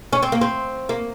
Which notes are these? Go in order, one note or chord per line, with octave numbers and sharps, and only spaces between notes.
C#4
C4
A#3
C4
A#3